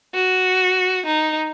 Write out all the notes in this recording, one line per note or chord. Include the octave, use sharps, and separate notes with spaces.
F#4
D#4